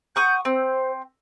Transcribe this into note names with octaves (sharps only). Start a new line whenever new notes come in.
F#5 C#6 D#6 G6
C4 C5